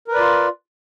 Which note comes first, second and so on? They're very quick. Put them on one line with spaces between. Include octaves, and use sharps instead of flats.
A#4 B4 D5 F4